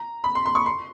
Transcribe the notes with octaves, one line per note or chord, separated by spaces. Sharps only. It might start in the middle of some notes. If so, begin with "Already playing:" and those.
Already playing: A#5
B5
C6
C6
C#6
C6